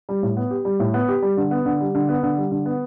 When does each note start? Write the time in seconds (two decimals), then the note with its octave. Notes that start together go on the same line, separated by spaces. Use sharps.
0.09 G3
0.23 A2
0.37 B3
0.51 G4
0.65 G3
0.80 A2
0.94 B3
1.08 G4
1.22 G3
1.37 D3
1.51 B3
1.65 D3
1.80 G3
1.95 D3
2.09 B3
2.23 D3
2.37 G3
2.51 D3
2.66 B3